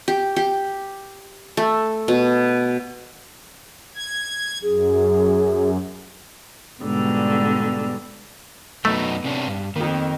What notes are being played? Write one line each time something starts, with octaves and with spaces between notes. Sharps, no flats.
G4
G4
A3
B2
G#6
F#2 G#4
G#2 B2 D3 G3
F#2 F#3 A3 B3 D#4
C3 C#4 D4
G2
F2 D#3 A#3